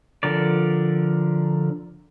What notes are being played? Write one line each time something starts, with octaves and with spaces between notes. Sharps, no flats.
D3 F3 A#4 D5